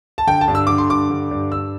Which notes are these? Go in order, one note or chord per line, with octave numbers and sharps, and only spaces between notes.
A5
D3 G5
A5
G2
E6
D3 D6
C6
G2 D6
D3
G2
G2 E6